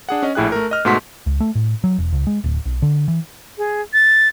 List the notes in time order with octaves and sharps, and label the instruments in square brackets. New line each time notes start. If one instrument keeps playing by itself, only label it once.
[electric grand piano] D4 G#4 F#5
C#4 D#5
A#1 A2 E4 G#4 G5 F#6
A3 A#4
D#5 F6
G#2 B2 A3 F#4 C6 B6
[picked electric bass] C#2
A3
A2
F#3
E1
C#2
G#3
D1
B1
D3
E3
[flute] G#4
A6